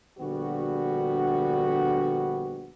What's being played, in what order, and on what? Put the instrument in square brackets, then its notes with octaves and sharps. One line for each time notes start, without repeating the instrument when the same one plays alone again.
[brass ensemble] A#1 D3 G3 B3 F#4